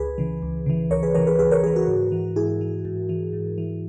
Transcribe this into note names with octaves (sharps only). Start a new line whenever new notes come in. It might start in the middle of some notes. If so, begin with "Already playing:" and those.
Already playing: C#2 G#4 B4
C#3 E3
C#2
C#3 E3
C#2 A#4 C#5
G#4 B4
C#3 E3 A#4 C#5
G#4 B4
C#2 G#4 B4
A#4 C#5
C#3 E3 G#4 B4
F#4 A#4
G#2
E3
G#2 E4 G#4
E3
G#2
E3
G#2
E3